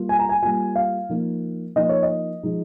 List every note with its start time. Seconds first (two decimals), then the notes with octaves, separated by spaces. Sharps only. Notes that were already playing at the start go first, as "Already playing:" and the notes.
Already playing: G3 A#3 F4
0.09 G#5
0.19 A#5
0.29 G#5
0.43 G3 A#3 F4 G#5
0.76 F5
1.09 F3 A#3 D#4
1.76 F3 A#3 D#4 D#5
1.89 C#5
2.03 D#5
2.43 F3 G#3 D#4